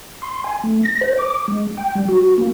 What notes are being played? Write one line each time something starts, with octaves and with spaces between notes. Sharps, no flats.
C6
G#5
A3
A#6
C5
D6
G#3
G5
G3
F#4
A#3